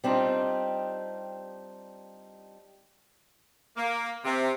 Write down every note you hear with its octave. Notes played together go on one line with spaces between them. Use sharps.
G3 C4 D4 D#4 F4
A#3
C3